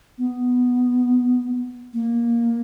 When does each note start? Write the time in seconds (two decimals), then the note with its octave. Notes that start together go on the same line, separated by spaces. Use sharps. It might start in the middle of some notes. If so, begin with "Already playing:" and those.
0.18 B3
1.94 A#3